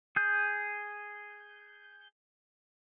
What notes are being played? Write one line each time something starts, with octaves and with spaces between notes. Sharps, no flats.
G#4 G6